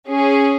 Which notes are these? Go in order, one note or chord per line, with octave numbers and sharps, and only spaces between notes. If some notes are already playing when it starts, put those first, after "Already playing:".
C#4 G#4